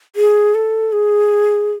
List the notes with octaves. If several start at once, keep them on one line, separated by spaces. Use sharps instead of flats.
G#4
A4
G#4